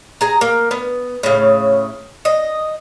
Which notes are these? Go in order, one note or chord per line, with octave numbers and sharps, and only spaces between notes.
G#4 A#5
A#3
B3
A2 C#3
D#5